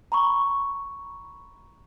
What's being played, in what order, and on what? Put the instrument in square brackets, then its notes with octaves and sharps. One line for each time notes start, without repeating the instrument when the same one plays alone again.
[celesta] A#5 B5 C#6